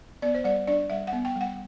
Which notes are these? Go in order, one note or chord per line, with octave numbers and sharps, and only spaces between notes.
B3 D5
C5
G3 D5
D4 D5
G3 E5
F#5
B3
G5
G3 F#5